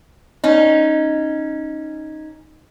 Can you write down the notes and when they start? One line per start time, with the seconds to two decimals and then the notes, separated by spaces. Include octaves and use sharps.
0.44 C#4 D#4